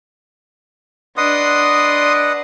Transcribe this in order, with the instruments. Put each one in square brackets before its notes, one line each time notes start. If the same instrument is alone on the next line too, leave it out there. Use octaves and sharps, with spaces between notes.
[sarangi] D4 [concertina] B4 D#5 F#5 [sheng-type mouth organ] C6 D#6